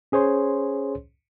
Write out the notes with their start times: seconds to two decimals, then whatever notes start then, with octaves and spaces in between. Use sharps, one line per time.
0.12 C#4 G#4 C5 C#5 C6